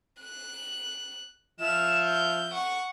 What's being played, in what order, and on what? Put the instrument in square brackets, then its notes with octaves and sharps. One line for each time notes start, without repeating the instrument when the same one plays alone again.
[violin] F#6
[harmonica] F3 E5 F6 [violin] E7
[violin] G6
F#5 C#6